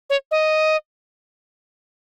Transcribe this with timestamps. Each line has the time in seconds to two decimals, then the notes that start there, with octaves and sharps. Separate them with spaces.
0.10 C#5
0.31 D#5